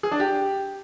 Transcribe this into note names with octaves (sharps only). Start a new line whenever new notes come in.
G#4
D4
G4